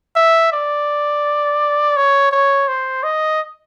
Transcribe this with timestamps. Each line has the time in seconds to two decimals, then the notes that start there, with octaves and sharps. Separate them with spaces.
0.16 E5
0.52 D5
1.96 C#5
2.32 C#5
2.68 C5
3.03 D#5